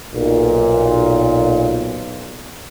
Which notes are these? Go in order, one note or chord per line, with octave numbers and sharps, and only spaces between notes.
B1 A#2